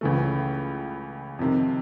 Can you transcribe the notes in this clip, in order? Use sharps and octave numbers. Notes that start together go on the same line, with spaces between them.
C#2 C#3 E3 A3
F2 C3 D#3